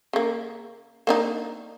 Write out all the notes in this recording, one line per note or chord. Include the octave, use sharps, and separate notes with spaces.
C#3 A#3
A#3 D4 D#4